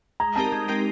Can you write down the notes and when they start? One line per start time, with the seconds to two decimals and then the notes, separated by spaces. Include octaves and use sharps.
0.20 G#3 A#5
0.36 C4 D#4 G4 A#4 A5
0.52 G#3
0.68 C4 D#4 G4 A#4